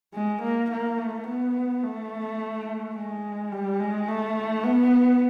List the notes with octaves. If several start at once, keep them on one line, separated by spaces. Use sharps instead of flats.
G#3
A#3
A#3
A3
B3
A3
G#3
G3
G#3
A3
B3